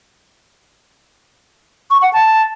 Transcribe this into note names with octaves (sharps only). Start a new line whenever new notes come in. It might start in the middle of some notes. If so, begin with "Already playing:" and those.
C#6
F#5
A5